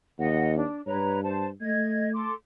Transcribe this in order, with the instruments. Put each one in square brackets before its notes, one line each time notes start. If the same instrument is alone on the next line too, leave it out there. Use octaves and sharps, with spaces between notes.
[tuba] D#2 [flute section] D#5 F#5
[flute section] D4
[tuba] G2 [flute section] B4 C#5 A#5
[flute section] C5 A5
[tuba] A3 [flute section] D#5 G#6
[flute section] A4 C6 D6